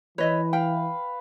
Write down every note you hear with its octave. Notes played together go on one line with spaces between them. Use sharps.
E3 B4 C#5 D#5 E5
F5 G5 B5